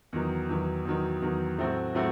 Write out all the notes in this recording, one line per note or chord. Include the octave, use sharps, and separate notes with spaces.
E2 D#3 F#3
E2 D#3 F#3
E2 D#3 F#3
E2 D#3 F#3
A2 F#3 A3 C4 F#4
A2 F#3 A3 C4 F#4